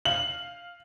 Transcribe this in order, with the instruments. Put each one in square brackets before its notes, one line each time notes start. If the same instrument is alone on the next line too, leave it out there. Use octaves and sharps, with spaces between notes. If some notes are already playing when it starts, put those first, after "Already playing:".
[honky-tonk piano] F5 [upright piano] F#7